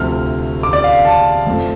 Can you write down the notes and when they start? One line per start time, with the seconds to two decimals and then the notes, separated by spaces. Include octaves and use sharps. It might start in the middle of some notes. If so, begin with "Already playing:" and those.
Already playing: D2 C3 F3 A3 F6
0.63 D6
0.73 D5
0.84 F5
1.05 A5
1.47 F2 F3 A3